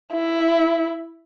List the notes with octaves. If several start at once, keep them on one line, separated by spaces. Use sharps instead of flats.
E4